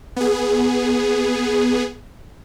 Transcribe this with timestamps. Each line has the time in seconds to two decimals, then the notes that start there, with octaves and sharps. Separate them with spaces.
0.16 B3 G#4